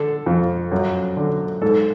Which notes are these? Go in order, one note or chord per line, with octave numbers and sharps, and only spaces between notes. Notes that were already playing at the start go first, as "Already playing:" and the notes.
Already playing: D3 A4
F2
F#2
D3
G#2 A4